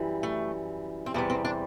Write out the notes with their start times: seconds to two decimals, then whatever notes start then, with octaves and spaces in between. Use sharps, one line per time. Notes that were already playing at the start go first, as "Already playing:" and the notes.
Already playing: F#2 E3 G3
0.23 A3
1.06 C4
1.14 E2 C3 G3 B3
1.30 C4
1.45 D4